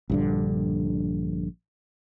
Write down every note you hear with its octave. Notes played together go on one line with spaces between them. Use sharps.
A#1 G2 D3